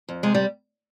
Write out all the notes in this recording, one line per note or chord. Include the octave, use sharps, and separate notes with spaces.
F2
C3 G#3
G3